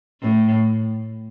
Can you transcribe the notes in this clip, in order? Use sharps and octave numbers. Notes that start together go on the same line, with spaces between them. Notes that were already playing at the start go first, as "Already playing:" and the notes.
A2